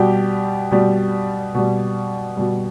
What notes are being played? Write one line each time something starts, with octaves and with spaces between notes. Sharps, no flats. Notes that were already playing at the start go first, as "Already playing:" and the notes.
Already playing: B2 G3 G4
B2 G3
B2 G3
B2 G3